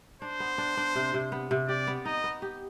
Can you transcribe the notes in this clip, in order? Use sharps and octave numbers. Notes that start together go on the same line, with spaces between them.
D4 C5
B3
D4
D4
C3
C3
B3
C3
G4 D5
B3
D#4 D#5
B3
G4